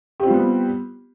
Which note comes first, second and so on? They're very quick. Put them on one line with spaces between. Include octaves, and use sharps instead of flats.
G4 C4 F4 G3 B3